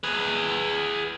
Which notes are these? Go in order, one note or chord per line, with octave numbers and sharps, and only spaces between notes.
G#4 B4